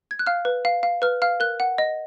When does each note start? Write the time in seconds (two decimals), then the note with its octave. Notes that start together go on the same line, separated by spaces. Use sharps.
0.11 G#6
0.19 F#6
0.26 F5 F6
0.45 B4
0.65 F5
0.83 F5
1.02 B4 F6
1.22 F5 F6
1.40 A#4 F#6
1.60 F#5
1.78 D#5